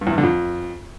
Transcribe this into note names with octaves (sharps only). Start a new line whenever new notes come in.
G2
E2
G2
D3
F2